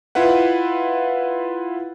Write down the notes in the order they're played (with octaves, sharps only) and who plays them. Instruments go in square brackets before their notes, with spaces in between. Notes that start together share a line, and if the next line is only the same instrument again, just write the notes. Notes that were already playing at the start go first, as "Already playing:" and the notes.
[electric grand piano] E4 F4 B4 F#5